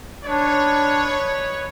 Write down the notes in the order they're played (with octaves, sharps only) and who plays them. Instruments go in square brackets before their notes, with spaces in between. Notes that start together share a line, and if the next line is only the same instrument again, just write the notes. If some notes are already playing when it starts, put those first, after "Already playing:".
[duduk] D4 [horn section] D#4 B4 C#5